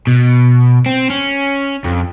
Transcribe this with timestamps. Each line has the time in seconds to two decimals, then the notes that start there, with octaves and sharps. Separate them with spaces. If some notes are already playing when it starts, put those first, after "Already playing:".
0.07 B2
0.86 C4
1.10 C#4
1.84 F2